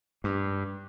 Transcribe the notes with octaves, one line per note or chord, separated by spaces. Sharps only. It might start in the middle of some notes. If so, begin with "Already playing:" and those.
G2